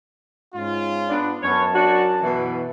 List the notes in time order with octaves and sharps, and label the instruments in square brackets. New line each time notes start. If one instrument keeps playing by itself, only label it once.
[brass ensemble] G#2 C#4 F4
[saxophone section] B3 D4
[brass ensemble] F#2 A5 [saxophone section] B3 C#4 C#5
[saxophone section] D4 F#4
B2 E3